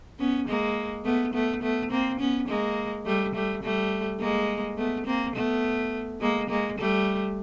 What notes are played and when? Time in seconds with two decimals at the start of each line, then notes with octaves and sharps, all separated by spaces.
0.19 B3 C#4
0.48 G#3 A#3
1.05 A3 B3
1.33 A3 B3
1.62 A3 B3
1.91 A#3 C4
2.20 B3 C#4
2.48 G#3 A#3
3.06 G3 A3
3.35 G3 A3
3.63 G3 A3
4.20 G#3 A#3
4.78 A3 B3
5.06 A#3 C4
5.34 A3 B3
6.21 G#3 A#3
6.50 G#3 A#3
6.78 G3 A3